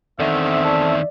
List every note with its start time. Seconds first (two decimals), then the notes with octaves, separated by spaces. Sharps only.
0.19 E2 D3 D#3 C4 E5
0.64 A4 D5